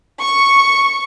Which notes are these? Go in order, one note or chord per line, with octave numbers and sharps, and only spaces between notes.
C#6